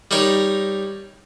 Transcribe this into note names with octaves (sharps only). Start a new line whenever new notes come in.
G3 D#4 A#4 C#5